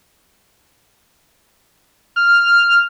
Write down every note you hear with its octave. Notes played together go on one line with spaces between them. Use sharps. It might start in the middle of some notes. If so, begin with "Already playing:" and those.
F6